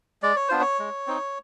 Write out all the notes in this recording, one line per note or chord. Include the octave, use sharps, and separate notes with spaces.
G#3 D5
C#5
B3 D4 F4 C5
C#5
G#3
C4 D#4